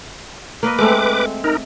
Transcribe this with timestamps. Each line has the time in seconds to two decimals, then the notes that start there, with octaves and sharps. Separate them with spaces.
0.63 A#3 B4 D#5
0.79 G#3 A3 C4 B4 D6
1.44 D#4 A#4